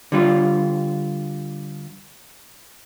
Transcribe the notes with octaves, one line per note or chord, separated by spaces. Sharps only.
D3 G3 F4